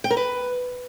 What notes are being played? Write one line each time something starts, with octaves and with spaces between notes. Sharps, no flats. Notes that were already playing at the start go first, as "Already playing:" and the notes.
G5
A#4
B4